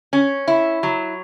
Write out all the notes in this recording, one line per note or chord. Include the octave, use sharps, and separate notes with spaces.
C#4
E4
F#3